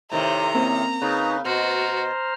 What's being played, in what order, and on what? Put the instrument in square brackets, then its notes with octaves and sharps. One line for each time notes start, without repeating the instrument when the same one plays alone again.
[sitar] A2 C3 D#3 [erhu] A#5
[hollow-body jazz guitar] A#3 C4 C#4
[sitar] C#3 [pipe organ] D#4 B4
[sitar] B2 [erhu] F#4 [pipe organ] C5 A#5 F6